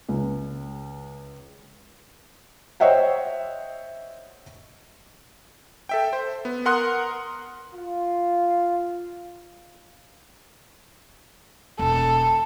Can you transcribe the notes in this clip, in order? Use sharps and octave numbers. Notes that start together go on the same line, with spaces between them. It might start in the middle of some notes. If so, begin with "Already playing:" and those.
C#2
C5 C#5 D#5 E5 F#5 G5
A4 E5 G5
C5
B3
A#4 F#5 C6 D#6 F#6
F4
E1 A4